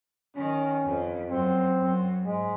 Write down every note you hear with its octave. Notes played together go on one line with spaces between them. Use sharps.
D#3 C#4
F2
F#2 C4
F#2
G#2 G#3